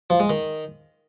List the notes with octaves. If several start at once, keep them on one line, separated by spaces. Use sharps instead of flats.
F3
G#3
D#3